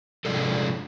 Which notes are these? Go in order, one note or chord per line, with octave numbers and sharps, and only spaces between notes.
C3 F3 G#3 D4 A4